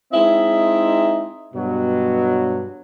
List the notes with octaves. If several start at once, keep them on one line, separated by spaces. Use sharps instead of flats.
G#3 C4 D#4 E4 D#5 E5
G2 B2 F#3